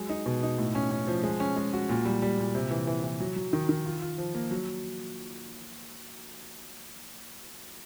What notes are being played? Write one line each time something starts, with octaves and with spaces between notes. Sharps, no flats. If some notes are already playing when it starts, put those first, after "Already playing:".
Already playing: F#3 G#3
D#4
B2
D#4
A2
C#4
C#4
F3
G#3
C#4
G#3
F#4
A#2
G3
G3
A#2
C3
E3
E3
E3
F#3
F#3
D#3
D#3
F4
F4
F3
A#3
F#3